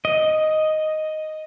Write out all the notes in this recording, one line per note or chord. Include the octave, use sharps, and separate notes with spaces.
D#5